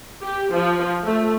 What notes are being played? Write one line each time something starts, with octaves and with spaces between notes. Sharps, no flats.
G4
F3
A3